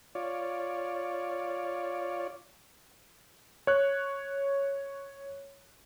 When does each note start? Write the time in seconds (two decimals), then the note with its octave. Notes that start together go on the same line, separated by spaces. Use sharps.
0.15 F4 C#5 D5
3.67 C#5 F#6